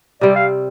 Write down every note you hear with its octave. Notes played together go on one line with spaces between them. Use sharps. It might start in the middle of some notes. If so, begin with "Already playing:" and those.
C3 G3 C4 D5
F5